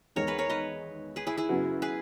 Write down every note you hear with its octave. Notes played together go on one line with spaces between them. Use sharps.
E2 D#3 G#3 D#4 A#4 C#5
G#4 B4
A#4 C#5
B4 D#5
G#4 B4
E4 G#4
E4 G#4
F#2 C#3 F#3 B3 F#4
G#4 B4